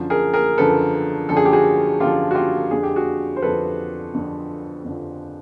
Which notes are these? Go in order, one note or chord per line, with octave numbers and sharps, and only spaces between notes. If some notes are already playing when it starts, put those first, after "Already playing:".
Already playing: F#2 D3 F3
G#4 A#4
G#4 A#4
F#2 D3 F3 A4 B4
F#2 D3 F3 A4
G#4
G4
F#4 G#4
F#2 D3 F3 F4 G4
F#4
F4 G4
F2 D3 F3 G#4
G4
F#4 G#4
C5
F2 D3 F3 A4 B4
F2 D3 F3
F2 D3 F3